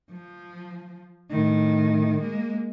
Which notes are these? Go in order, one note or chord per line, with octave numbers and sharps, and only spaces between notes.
F3
A2 D#3
G#3 A#3